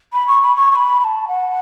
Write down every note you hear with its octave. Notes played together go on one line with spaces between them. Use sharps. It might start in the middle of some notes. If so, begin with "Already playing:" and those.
B5
C#6
B5
C#6
C#6
B5
B5
A5
F#5